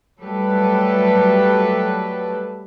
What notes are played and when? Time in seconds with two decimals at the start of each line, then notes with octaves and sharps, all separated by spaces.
0.22 F#3 G3 A3 G4 A4 B4